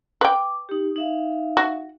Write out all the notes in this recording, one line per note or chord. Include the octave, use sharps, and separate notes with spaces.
B4 G5 D6
D#4 G4
D#4 E5 F5
F#4